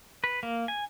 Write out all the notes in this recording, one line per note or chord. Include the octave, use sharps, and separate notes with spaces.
B4
A#3
G#5